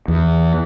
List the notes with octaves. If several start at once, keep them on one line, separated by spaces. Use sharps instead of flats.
E2